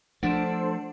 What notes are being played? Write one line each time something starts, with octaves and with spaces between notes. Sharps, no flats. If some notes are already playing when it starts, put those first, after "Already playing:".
F3 A3 D4 A4 C5 F#5 E7